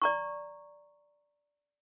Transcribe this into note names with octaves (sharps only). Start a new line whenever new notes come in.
D5 A#5 C#6